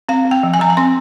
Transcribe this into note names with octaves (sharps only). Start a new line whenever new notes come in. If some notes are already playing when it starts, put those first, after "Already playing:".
C4 F5
C4
G5
F3
G#5
F3 A#5
G#5
C4 C6